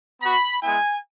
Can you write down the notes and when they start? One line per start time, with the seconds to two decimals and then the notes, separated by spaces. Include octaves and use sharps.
0.22 B3 F#4 B5
0.62 G#3 B3 E4 G#5